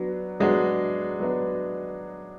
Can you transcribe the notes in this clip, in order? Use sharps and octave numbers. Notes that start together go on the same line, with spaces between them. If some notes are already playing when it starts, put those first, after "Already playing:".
Already playing: F#3 B3 D4 F#4
F#3 G#3 B3 D4 F#4
F#3 B3 D4